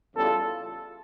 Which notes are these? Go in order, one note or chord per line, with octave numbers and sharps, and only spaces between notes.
E2 C#3 E3 G3 F4 A4